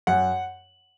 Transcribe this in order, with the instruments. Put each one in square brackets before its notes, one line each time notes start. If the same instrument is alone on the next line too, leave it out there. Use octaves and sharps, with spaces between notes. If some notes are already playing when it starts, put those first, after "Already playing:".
[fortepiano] F#2 F#5